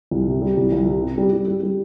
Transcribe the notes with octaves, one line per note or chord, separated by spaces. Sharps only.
C2
C3
G3
C2
C2
G3
C3
G3
G3
G3
G3